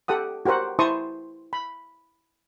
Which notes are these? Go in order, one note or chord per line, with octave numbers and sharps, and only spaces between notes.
G4 A4 F#5 D#6
F#4 G4 A#4 C5 F#5
E4 C5 A5 C6 C#6 D#6
B5